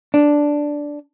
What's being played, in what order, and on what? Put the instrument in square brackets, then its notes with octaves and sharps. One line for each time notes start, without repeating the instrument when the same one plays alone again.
[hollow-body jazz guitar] D4